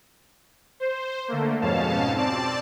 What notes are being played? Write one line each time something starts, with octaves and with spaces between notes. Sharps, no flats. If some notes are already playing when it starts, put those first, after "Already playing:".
C5
D3 A3 A#3
F2 G#2 B2 C#4 F5 A5
C4 D5 A5